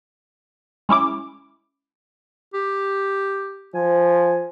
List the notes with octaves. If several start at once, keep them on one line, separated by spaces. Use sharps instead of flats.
G#3 C#4 E4 D6
G4
F3 G#5